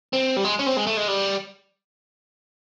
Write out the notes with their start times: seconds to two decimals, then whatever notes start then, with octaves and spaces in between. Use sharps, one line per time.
0.13 C4
0.36 G3
0.44 G#3
0.59 C#4
0.66 C4
0.77 G#3
0.87 A3
0.97 G#3
1.08 G3